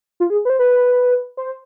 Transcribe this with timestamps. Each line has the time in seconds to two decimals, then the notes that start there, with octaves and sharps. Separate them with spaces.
0.20 F4
0.30 G#4
0.45 B4
0.50 C5
0.59 B4
1.37 C5